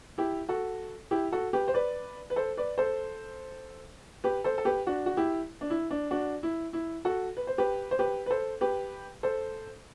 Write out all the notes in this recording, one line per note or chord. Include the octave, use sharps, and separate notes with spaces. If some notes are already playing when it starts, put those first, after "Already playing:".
E4 G4
F#4 A4
E4 G4
F#4 A4
G4 B4
C5
B4 D5
B4
A4 C5
B4 D5
A4 C5
G4 B4
A4 C5
A4
G4 B4
D4 F#4
F#4
E4 G4
D4
E4
D4
D4 F#4
E4
E4
F#4 A4
B4
C5
G4 B4
C5
G4 B4
B4
A4 C5
G4 B4
A4 C5